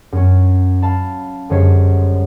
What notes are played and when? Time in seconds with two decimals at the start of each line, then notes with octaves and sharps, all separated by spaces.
0.12 F#2 C#4
0.82 F5 A5 B5
1.49 G1 F#2 G#3 C5 C#5 B6